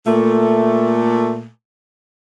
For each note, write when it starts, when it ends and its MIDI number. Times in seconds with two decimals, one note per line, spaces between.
0.05 1.48 46
0.05 1.48 57